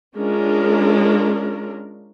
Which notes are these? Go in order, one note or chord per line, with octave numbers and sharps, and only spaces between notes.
G#3 C#4 D4 F4 A#4